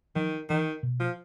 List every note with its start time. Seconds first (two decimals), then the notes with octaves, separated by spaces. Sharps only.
0.16 D#3 F3
0.50 D#3 E3
0.83 B2
1.00 F3